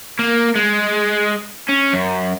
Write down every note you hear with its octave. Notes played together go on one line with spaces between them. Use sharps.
A#3
G#3
C#4
F#2